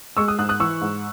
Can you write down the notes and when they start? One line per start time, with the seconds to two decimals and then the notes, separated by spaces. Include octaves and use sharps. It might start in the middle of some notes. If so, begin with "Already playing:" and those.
0.17 G#3 C#6 E6
0.28 D#6 F#6
0.39 G#2 D#6 F#6
0.49 D#6 F#6
0.60 E3 C#6 E6
0.81 G#2